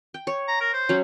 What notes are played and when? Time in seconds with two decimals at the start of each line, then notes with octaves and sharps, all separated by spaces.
0.14 G5
0.27 C#5
0.48 A#5
0.60 A#4
0.73 C5
0.89 F#3 C#4